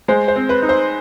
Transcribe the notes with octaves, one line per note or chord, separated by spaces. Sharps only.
G#3 C5
C5
C4
B4
D#4
C5